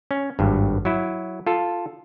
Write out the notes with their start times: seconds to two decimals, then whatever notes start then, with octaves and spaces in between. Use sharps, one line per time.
0.11 C#4
0.39 G#1 G2
0.85 F#3 E4
1.47 F4 A4